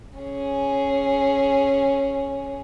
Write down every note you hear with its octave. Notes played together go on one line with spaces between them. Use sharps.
C#4 G#4